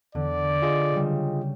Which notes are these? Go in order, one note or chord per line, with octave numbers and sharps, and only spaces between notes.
E2 D3 D5
F4 G#4 D#5
C#3 G3